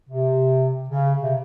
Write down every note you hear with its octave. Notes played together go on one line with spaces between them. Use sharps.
C3
C#3
C3